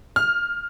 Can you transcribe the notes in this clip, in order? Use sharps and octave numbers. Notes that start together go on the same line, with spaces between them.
F6